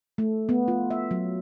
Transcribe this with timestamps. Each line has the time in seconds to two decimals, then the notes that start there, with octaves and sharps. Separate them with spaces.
0.18 A3
0.49 B3
0.68 F4
0.91 E5
1.11 F#3